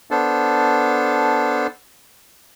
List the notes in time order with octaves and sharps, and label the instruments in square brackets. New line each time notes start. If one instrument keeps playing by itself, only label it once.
[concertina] B3 D4 A4 C5